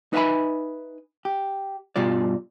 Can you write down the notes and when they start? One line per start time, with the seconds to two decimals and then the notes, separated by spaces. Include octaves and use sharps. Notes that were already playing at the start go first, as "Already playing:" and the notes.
0.13 D#4 B4 E5 F5 G#5 B5
1.25 G4
1.96 G2 B2 G3 F4 D5